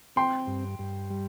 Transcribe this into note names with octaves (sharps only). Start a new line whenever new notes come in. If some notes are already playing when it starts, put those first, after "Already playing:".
C4 G5 C6
G2
G2
G3